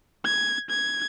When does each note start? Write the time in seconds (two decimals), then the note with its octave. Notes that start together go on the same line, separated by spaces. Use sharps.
0.25 G#6
0.70 G#6